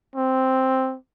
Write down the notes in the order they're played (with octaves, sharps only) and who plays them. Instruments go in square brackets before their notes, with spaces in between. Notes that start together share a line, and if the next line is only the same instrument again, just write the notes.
[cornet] C4